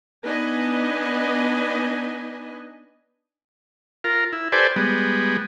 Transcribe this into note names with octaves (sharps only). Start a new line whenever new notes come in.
B3 D4 D#4 B4 D#5 G#5
F4 A#4
E4
G4 A4 B4 C5 D5 G#5
G3 G#3 B3